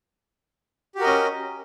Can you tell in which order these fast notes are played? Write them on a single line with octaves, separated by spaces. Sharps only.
G4 F#4 A#4 D#5 C#4